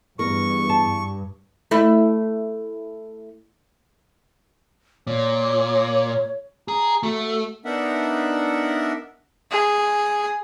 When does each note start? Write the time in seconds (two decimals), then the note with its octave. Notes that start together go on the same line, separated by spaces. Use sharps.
0.19 E2 G2 A#4 C#6
0.69 A5
1.71 A3 E4
5.07 A#2 C#5
6.68 G#4 A#5
7.03 A3 F#4
7.65 B3 D4 D#4 A#4 E5 F#5
9.51 G#4